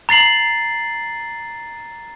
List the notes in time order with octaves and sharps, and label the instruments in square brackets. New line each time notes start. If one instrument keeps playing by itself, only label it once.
[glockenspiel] A#5 A6 C7 F#7